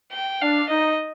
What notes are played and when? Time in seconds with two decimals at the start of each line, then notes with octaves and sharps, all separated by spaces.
0.12 G5
0.41 D4 F5
0.69 D#4 D#5